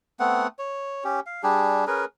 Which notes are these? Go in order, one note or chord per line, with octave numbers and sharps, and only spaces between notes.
A3 B3 C4 F#5
C#5
C#4 G4
F5
G3 D4 G4 G#4
C#4 G#4 A#4 B4